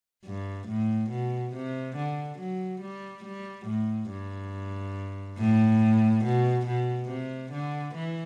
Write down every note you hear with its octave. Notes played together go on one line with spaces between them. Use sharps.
G2
A2
B2
C3
D3
F#3
G3
G3
A2
G2
A2
B2
B2
C3
D3
E3